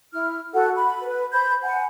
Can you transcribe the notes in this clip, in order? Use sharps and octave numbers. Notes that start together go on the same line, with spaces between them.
E4 F6
F#4 A4 F#5
B5
B4
C5 B5 G6
F#5 G#5